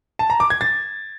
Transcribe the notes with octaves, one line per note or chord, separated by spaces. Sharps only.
A5
A#5
D6
G#6
A6